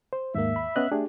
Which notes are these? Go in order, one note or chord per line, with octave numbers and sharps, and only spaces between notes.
C5
D#2 G#2 A#3 E5
B5
B3 C#4 D#5 F#6
A3 D4 G4 G#4